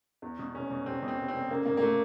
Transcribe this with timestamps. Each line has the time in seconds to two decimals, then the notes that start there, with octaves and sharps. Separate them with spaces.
0.22 E2
0.39 B2
0.55 F1 C#4
0.71 B2
0.86 F1 C4
1.03 B2
1.08 C4
1.18 F1
1.28 C4
1.34 F1
1.50 C#3 A#3
1.66 G#1 A#3
1.77 A#3
1.82 A3